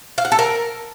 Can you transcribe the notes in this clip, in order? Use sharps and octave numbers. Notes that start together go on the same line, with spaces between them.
F5
F#5
A4
A#4